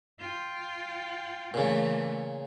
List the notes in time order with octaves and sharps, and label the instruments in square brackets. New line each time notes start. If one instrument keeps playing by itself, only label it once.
[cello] F4 G5
[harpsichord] A#2 C#3 [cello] E3 A3